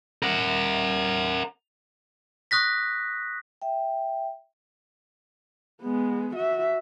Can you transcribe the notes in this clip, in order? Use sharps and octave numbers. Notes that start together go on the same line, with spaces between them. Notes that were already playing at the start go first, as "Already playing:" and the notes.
A#4 F#5
C#6 D#6 F#6 A#6 B6
E5 G5
G#3 B3
F#4 E5